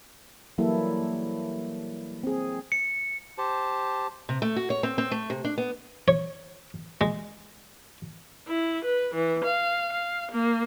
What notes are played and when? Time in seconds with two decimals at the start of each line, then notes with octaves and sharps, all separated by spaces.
0.58 E3 F#3 G3 A#3 E4 A4
2.23 C4 G#4
2.72 C#7
3.38 G4 C5 A5
4.29 C3
4.42 A3
4.56 F#4
4.70 C#5
4.83 C4
4.98 C4
5.11 A3
5.30 C3
5.45 D4
5.58 B3
6.08 C#5
7.01 G#3
8.48 E4
8.85 B4
9.14 E3
9.44 F5
9.92 F5
10.32 A#3